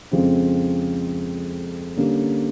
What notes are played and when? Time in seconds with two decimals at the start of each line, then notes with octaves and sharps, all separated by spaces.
0.11 F2 C#3 F3 G#3 C4
1.97 D3 G3 A#3 C#4